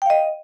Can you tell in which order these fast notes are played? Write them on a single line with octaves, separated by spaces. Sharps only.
G5 F5 D#5